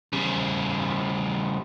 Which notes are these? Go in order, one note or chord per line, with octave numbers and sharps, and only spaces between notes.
C#3 G3